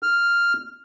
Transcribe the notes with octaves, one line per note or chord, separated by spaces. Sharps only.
F6